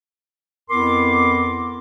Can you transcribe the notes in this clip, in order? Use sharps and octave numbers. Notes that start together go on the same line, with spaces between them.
F2 B3 E4 A#4 C6 D6